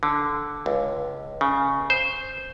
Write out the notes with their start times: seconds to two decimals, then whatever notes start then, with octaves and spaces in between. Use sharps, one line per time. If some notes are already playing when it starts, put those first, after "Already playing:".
0.03 D3
0.66 C#2
1.41 C#3
1.90 C5